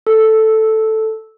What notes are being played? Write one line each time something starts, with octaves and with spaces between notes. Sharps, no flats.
A4